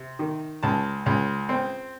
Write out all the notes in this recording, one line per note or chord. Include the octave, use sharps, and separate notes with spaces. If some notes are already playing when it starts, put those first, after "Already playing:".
Already playing: C3
D#3
C#2 A5
C#2
C4